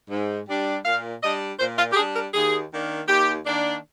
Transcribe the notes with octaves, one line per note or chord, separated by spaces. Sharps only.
G#2
G3 D4
A#2 F5
G3 D4 D#5
A#2 C5
F4
G4
G3 D4 G#4
A#4
D#2 G#4
D#3 A#3 D4
D#2 G4
D#3 A#3 D4